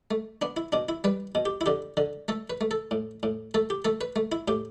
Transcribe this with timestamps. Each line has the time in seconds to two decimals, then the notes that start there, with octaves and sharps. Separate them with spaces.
0.11 A3
0.42 B3 D4
0.57 E4
0.72 B2 D4
0.89 E4
1.04 G3 B4
1.35 B2
1.46 G4
1.61 E4
1.66 D3 G4
1.97 D3
2.28 A3 A4
2.50 B4
2.61 A3
2.71 A4
2.91 A2
3.23 A2
3.54 A3 A4
3.70 G4
3.85 A3 A4
4.01 B4
4.16 A3
4.32 E4
4.48 A2 G4